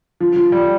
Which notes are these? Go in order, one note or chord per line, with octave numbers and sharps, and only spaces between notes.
F3
F3
G3